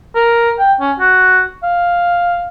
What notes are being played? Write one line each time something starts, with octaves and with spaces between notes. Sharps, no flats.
A#4
G5
C#4
F#4
F5